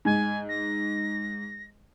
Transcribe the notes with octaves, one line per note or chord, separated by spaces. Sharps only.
G#2 G#5
A#6